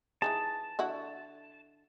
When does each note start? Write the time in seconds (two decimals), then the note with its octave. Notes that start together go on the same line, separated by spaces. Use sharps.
0.22 E3 D#4 G#4 A5
0.79 D3 E4 F#4